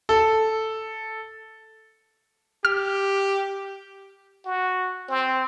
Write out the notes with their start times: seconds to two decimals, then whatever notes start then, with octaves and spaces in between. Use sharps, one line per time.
0.09 A4
2.65 G4 F6
4.46 F#4
5.09 C4